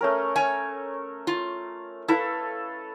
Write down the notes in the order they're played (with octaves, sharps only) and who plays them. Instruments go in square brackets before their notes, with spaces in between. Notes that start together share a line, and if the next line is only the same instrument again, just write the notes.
[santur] A3 C#4 A#4
[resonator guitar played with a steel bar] C#5 G#5
F4
[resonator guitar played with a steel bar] E4 [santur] A4 B4 F5